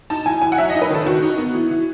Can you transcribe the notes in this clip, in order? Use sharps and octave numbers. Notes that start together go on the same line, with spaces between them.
D#4 A5
E3 G#5
E3 G#5
F#5
F#3 E5
D#5
D#4
B4
D#3 A4
D#3 F#4
D#4
B3
E3
E3